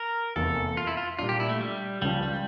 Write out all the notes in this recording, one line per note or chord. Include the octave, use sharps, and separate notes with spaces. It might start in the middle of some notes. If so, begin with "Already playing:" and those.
Already playing: A#4
F1 E2 E3 A#3 A4
F4
E4
F4
A#2 G3 D4 F4
G4
E4
A3
G3
C#2 C#3 F3 G3
G3